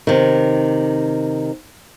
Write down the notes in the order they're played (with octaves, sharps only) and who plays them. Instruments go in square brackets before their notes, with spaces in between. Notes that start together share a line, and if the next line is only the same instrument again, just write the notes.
[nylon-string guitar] C3 D#3